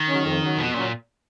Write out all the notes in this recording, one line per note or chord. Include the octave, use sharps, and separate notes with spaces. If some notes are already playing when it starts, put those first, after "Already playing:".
Already playing: D#3
C#3 F#3 C#4
F2
C#3 F#3 C#4
F2 B2
A#2 C#3 F#3 C#4